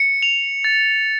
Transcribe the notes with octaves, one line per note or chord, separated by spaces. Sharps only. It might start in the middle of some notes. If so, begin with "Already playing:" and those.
Already playing: C#7
F7
A6